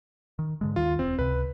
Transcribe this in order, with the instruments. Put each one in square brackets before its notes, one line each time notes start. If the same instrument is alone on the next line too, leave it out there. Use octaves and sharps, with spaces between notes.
[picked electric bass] D#3
G#2 D3 G#3
[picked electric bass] D#2 D#3 [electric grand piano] F4
[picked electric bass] E1 [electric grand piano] C4
[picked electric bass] C#2 C3 [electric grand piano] B4